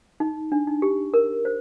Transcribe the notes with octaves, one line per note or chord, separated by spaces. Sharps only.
D#4
D4
D#4
G4
A#4
C5